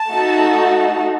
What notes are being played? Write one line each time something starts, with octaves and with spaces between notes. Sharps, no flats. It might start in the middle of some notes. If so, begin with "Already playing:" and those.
Already playing: A5
A3 D#4 F#4 A4